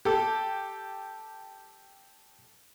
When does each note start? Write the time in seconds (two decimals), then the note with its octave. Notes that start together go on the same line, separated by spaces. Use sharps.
0.05 G4 A4